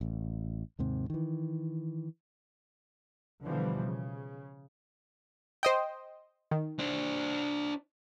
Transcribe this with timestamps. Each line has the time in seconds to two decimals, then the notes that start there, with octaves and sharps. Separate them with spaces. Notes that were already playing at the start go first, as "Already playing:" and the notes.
0.01 A1
0.79 D#2 G#2 C3
1.10 D#3 E3
3.44 B2 D3 E3 F3 G3
3.84 C#3
5.63 C5 D#5 G5
6.51 D#3
6.79 D4 C5